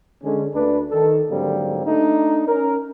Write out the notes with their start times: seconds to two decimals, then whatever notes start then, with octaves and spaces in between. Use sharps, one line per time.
0.24 D3 G#3 C#4
0.54 D2 A3 D4 B4
0.91 D#3 A4
1.30 G#2 D3 F#3 G3 A#3 C4
1.85 A3 D4 D#4
2.47 C#4 A#4